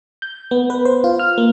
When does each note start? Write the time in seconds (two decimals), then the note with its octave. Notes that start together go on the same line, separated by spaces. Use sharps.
0.22 G6
0.51 B3
0.70 B4
0.85 C5
1.04 F4
1.19 F6
1.38 A#3